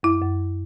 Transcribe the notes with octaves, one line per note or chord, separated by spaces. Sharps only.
F#2 E4
F#2